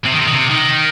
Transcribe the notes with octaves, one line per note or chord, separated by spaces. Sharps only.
C3
D#3
C3
D#3
C3
D#3